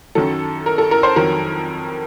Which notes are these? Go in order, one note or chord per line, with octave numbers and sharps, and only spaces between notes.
F#2 D#3 F#3 A4
A#4
A4
A#4
C5
F2 D#3 F#3 A#4